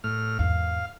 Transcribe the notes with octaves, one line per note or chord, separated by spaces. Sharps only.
A2 F6
E2 G#2 F5